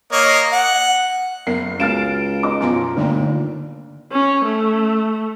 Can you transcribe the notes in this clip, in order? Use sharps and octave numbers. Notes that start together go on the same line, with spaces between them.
A#3 C#5 D#5
F#5
F#1 B3 A#4 C7
C#2 F#4 F5 F6 A6 D7 E7
D#4 D6
F#2 B2 F3 G#5 A#5 C6
G1 A#2 D3 A3 D#4 G5
C#4
A3